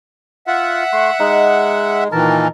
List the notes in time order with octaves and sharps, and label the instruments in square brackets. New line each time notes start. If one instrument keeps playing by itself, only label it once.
[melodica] F4 [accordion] E5 F#5
[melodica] A3 C6
[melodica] G#3 [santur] D#4
[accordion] A#2 D#3 E3 [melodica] A#4 A5